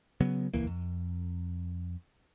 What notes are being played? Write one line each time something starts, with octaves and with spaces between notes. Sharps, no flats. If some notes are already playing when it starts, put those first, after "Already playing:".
C#3 F#3 B3
D#1 C#2 E3 A#3
F2